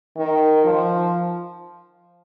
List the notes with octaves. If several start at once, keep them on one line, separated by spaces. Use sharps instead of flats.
D#3
F3